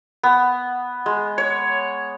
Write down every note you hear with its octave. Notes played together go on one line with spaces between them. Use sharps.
B3
G#3
C#5